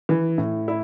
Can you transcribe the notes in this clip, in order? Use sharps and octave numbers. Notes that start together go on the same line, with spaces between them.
E3
A2
E4